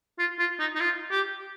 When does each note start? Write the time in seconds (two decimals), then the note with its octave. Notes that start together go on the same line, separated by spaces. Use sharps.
0.19 F4
0.39 F4
0.60 D#4
0.75 D#4
0.80 F4
1.11 G4